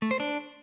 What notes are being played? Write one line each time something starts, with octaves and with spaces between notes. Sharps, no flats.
A3
C5
D4